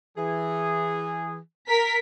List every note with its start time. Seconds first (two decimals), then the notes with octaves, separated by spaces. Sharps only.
0.18 E3 G#4
1.68 A#4 B6